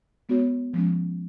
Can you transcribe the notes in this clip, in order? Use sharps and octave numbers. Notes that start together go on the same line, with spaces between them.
G#3 B3 F#4 C#5
F3 G#3 C#4